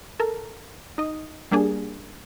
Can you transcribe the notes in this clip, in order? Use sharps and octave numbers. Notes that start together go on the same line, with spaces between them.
A4 A#4
D#4 D#5
G3 A#3 D4 G#4